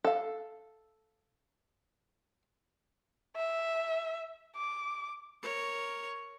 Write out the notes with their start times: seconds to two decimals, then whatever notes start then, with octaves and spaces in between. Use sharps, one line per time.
0.04 A4 F5
3.36 E5
4.56 D6
5.42 A#4 C#5